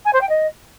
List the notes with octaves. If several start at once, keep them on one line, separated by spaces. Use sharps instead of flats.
G#5
C5
G5
D#5